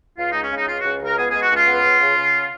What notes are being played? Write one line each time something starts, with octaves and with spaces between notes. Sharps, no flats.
C#2 F4
G#3 D#4
C#4
C#3 D#4
C#2 F4
C#3 F#4
C#2 A#4
B3 G#4
G#4
G#3
F#4
C#2 F4
B3
C#3
C#3
C#3